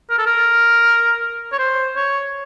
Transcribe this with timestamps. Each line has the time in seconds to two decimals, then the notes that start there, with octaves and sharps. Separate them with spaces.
0.10 A#4
0.18 A4
0.26 A#4
1.52 C#5
1.59 C5
1.96 C#5